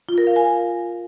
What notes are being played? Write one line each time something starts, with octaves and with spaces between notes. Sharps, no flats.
F4
A#4
F5
G#5